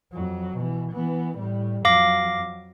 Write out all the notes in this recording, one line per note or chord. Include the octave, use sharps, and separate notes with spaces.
F2 F#3
B2 E3
E3 B3
A2 G3
F2 F#3 F5 D6 A#6